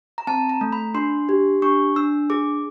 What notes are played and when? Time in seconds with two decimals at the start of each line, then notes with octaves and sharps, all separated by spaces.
0.18 A#5
0.27 C4 A5
0.49 A#5
0.61 A3
0.72 B5
0.94 D4 C6
1.29 G4
1.62 D4 C#6
1.96 D4 E6
2.30 G#4 D6